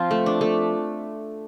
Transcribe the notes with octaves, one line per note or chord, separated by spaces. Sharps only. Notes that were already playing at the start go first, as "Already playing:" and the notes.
Already playing: F3 C4 F4
A3
D4
A3